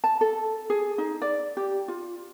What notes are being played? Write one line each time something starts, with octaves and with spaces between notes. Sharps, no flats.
A5
A4
G#4
D#4
D5
G4
F4